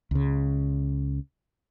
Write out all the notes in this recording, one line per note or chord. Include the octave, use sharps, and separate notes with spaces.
C#2 C#3